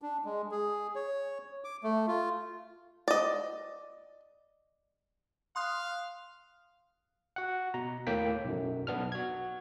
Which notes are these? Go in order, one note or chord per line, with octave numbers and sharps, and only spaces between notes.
D4
G#3
G#4
C#5
D6
A3
F4
D5 D#5
F5 C6 D#6 F#6
F#4 F#5
B2 A#5
D#2 A2 A#3 G5 B6
B1 F#2
B1 B3 D4 F6
F#4 G#6